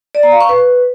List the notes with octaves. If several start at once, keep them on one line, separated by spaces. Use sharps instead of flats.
D5
A#5
F5
C#6
B4